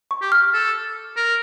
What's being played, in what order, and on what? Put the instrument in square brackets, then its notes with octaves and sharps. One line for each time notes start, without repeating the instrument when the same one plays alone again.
[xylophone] C#6
[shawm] G4
[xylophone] F6
[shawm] A4
A#4